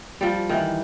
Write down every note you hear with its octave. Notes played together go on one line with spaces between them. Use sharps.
F3 G3
D#3 E3